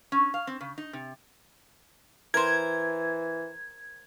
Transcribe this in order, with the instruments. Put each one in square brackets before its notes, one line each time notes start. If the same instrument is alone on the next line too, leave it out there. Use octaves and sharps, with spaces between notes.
[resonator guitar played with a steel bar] C#4
F5
C4
C#3
D#4
C3
[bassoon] E3 [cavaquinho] A#4 C5 [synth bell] G#6